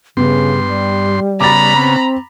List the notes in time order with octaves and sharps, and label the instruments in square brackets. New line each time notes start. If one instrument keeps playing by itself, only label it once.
[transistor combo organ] G2 C6 [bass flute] C#3 [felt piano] B3
[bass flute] G3
[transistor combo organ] C#3 B3 [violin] A#5 B5 [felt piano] D6 A6
[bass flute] C4